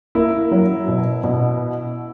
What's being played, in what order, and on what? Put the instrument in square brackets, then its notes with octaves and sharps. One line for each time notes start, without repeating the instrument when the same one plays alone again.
[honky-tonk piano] A#3 [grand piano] E4
[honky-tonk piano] F#3
B2
B2